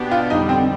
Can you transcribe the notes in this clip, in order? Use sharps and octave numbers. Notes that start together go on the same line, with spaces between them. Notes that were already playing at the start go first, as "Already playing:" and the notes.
Already playing: B2 B3 D4 G4
F4
F2 D3 G3 D#4
C4